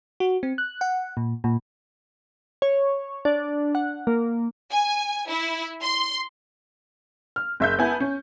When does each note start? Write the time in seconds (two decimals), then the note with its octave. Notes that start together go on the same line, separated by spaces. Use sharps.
0.20 F#4
0.43 C4
0.58 F#6
0.81 F#5
1.17 A#2
1.44 A#2
2.62 C#5
3.25 D4
3.75 F#5
4.07 A#3
4.71 G#5
5.27 E4
5.82 C6
7.36 F6
7.60 F#1 E5 G6
7.79 B3 E4 G#5 A5
8.00 C#4